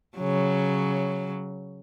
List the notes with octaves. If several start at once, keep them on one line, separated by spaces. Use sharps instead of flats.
C#3 F#3